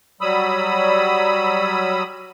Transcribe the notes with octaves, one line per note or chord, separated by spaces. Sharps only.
F#3 G3 B5 D#6 E6